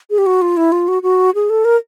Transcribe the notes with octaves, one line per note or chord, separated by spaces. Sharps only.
G#4
G4
F#4
F4
E4
F4
F#4
F#4
G#4
A4
A#4